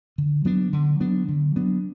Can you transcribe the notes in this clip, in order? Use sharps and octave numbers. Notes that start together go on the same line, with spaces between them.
D3
F#3 B3 D4
D3
F#3 B3 D4
D3
F#3 B3 D4